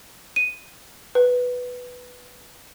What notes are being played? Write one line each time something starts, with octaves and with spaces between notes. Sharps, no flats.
D#7
B4